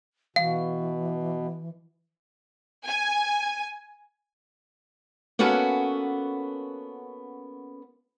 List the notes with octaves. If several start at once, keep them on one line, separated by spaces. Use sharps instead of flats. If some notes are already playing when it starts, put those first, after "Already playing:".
B2 E3 F5
G#5
A#3 B3 C#4 F#4 A4 B4